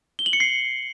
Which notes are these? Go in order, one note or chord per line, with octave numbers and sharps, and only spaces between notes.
G7
F#7
C#7
C7